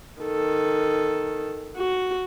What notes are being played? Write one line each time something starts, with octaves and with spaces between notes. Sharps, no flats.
D#3 A4
F#4